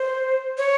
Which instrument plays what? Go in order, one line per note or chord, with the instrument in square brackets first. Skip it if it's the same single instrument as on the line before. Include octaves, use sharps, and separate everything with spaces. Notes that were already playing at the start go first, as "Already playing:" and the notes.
Already playing: [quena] C5
C#5